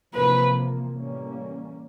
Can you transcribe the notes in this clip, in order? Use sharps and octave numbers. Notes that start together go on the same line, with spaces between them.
E2 C3 F3 A#3 B4
A2 E3 G3 A#3 C#4